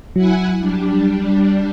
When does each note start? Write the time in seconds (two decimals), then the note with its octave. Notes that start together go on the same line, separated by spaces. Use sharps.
0.16 F#3 E4 F#5 G#5
0.59 G3 D4